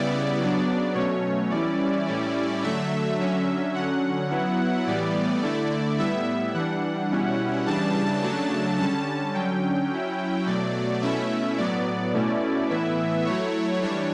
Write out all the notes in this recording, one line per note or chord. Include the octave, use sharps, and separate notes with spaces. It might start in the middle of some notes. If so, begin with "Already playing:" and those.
Already playing: C#3 G3 B3 E4 D5
C#3 F#3 B3 D4
B2 F#3 A3 C#4 C#5
E3 G3 C#4 E4 D5
A2 G3 C#4 E4
D3 F#3 A3 E5
D3 F#3 C#4
D3 F#3 C#4 F#5
F#3 B3 E4
A2 E3 G3 B3 D5
D3 A3 E4
A2 G3 B3 E4 E5
E3 G3 D4 F#5
B2 G3 C#4 E4
C#3 E3 G3 D4 A5
C#3 F#3 A3 D4
D3 G3 C#4 A5
D3 F#3 C#4 G5
F#3 C#4 E4
B2 F#3 A3 D5
B2 A3 C#4 E4 E5
A2 F#3 B3 D5
B2 A3 C#4 E4
A2 E3 B3 E4 E5
F#3 A3 E4 C#5
E3 G3 D4 C#5